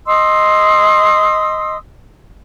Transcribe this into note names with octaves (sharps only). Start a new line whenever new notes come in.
D#5 C6 D#6 E6